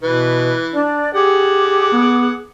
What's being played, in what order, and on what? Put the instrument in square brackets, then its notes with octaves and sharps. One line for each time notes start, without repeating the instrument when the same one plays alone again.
[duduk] B2 [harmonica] E3 [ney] B4
[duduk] D4 [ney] D5
[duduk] G4 [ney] G#4 [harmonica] F#5 D6
[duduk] B3